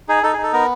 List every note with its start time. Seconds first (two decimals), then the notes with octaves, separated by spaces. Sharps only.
0.09 D#4 G#4
0.23 D#4 A4
0.33 G#4
0.38 D#4
0.43 A4
0.53 B3 A#4